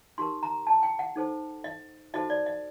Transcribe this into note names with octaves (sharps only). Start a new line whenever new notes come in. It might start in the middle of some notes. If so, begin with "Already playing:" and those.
D#4 G4 A#4 C6
A#5
A5
G5
F#5
D#4 A4 C5
D#5
D#4 F#4 A4 C5 D#5
D5
D#5